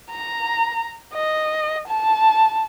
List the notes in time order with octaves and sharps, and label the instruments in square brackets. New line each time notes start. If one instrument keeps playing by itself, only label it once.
[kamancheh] A#5
D#5
A5